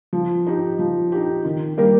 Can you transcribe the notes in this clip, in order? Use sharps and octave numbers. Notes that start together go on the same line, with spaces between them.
F3
D#4 G4
F3
D#4 G4
D#3
G3 A#3 G4 A#4